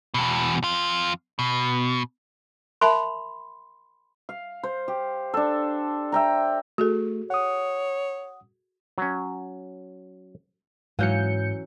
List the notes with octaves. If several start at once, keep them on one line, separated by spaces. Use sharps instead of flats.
E2 B2
F2 F4
B2
A#4 E5 A5 B5 C6
F5
C5
G4
D4 A4
E5 G5 A#5
A3 F#4 G#4 A4
C#5 F#5 D#6
F#3 C#4
G#2 E3 F#3 C#4 F5 G6 C#7